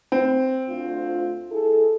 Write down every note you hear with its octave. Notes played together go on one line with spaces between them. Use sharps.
C4
D2 F4
E4 G#4 A4